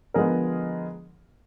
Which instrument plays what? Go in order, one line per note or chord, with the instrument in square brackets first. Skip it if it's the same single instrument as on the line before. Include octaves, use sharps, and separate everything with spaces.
[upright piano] D3 F3 G#3 B3 G#4 A#4